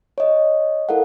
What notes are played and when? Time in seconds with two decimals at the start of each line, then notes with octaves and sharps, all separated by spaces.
0.18 C#5 D#5
0.89 E4 A4 A#4 F5 F#5